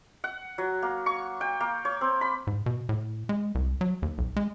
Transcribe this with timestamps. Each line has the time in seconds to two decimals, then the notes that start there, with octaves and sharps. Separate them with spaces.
0.24 F#5
0.58 F#3
0.82 A#3
1.06 C#6
1.41 G5
1.60 A#3
1.85 C#5
2.01 C4
2.21 B5
2.47 G#2
2.66 B2
2.89 A2
3.29 G#3
3.55 C2
3.81 F#3
4.02 D#2
4.18 B1
4.36 G#3